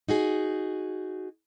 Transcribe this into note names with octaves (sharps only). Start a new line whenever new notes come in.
D#4 F#4 G#4